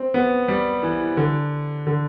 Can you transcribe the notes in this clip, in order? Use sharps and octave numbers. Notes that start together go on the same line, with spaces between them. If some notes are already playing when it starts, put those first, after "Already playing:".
Already playing: C4
B3
G3
E3
D3
D3